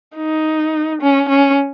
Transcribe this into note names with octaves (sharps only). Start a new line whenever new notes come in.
D#4
C#4
C#4